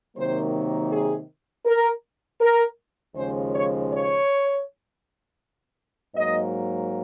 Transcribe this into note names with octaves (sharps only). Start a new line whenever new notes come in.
C3 D#3 F#3 A#3 C5
G#4
A#4
A#4
D#2 C#3 F3 G#3 C5
C#5
C#5
G#2 F#3 A#3 D#5